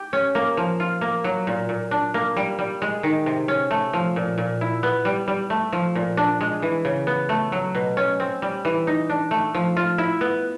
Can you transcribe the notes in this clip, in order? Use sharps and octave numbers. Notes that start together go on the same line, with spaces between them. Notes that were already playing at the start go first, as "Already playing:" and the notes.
Already playing: G4
C#4
A#3
F3
F4
A#3
F#3
A#2
A#2
D4
A#3
G3
G3
G#3
D#3
C3
C#4
A3
F3
A#2
A#2
E4
B3
G3
G3
A3
F3
A#2
D4
G#3
E3
C#3
B3
A3
F#3
B2
C#4
C4
G3
E3
D#4
D4
A3
F3
F4
E4
B3